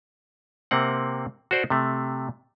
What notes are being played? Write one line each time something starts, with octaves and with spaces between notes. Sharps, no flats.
C3 A#3 C4 F#5
F#4 A4 C5 D5
C3 A3